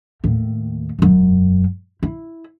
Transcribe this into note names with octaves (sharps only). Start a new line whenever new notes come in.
D#2 A2
E1 F#2
E4